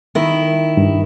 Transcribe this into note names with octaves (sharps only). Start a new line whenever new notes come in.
D#3 E4
G2